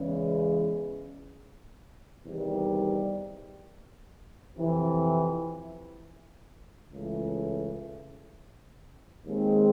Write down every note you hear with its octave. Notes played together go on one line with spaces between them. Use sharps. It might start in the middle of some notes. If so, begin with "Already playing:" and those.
Already playing: E2 C#3 E3 G#3 C#4
E2 C3 D#3 G3
F2 C3 E3
C#2 C#3 E3 A3
D#2 D#3 G#3 C4